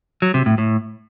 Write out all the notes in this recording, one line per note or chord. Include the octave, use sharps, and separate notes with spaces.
F#3
C3
A2
A2